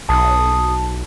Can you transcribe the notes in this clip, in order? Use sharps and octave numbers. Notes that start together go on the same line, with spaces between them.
B1 A5 D#6